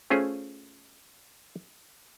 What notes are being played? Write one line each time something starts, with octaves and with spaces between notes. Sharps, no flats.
A3 C#4 F4 G#4 C5 G#5